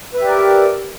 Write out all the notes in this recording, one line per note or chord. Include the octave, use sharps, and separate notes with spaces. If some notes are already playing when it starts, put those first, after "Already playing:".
G4 A#4 B4 D5 E5